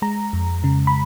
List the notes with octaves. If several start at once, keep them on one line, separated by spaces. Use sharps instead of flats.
G#3 A#5
F2
C#3
B5